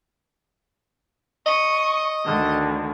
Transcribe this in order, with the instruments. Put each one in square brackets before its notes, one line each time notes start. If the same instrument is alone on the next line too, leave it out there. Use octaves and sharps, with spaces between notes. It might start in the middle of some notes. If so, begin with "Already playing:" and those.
[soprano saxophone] D#5 [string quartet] C#6 D#6
[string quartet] D2 D3 D#3